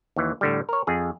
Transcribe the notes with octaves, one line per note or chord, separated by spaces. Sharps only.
D#2 E3
A2 D3 G3
A#4 C#5
F2 G#4